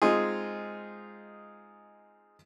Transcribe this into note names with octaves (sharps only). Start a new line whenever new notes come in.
G#3 C4 D#4 F4 G#4